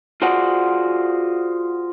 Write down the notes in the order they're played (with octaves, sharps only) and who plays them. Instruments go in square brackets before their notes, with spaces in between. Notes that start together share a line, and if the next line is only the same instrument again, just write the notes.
[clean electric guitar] F4 F#4 G#4 C5 D5 F#5